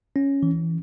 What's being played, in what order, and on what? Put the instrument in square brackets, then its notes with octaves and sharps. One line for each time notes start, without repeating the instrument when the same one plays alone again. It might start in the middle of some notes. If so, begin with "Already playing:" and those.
[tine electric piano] C#4
E3